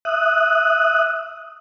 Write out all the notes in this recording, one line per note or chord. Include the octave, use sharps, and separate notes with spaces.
E5 D#6 F#6